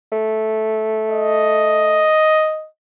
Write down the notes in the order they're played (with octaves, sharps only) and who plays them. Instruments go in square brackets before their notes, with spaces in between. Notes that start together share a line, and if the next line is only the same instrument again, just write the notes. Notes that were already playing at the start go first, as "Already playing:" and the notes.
[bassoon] A3
[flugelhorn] D#5